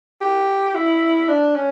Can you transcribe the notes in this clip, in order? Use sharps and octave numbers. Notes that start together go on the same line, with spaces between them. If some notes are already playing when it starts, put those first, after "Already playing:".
G4
E4
D4
C#4